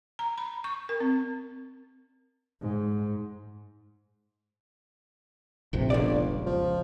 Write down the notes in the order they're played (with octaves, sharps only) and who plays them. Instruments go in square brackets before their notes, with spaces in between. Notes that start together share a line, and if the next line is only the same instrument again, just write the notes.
[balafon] A#5
B5
C#6
A#4
C4
[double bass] G#2
[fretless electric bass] F1 A#1 C3
[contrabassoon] G1 [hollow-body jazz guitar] C#2 D5
[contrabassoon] F3